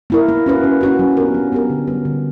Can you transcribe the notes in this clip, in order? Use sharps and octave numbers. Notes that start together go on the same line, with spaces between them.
A#3 E4 A#4
A#3
C#4 F#4 B4
A#3
C#4 F#4 B4
F#3
B3 D4 G4 A#4
F#3
B3 D4 G4 A#4
D3
G3 B3 F#4 B4
D3